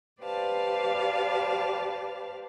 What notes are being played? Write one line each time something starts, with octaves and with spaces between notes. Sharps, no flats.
G4 B4 C5 D5 F5 A5